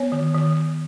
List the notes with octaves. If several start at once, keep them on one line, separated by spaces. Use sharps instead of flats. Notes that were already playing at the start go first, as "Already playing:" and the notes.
Already playing: B3 C#5
D#3
D#3